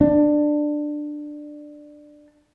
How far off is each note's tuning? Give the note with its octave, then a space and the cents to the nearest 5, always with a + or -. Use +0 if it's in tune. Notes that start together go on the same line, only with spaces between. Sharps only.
D4 +15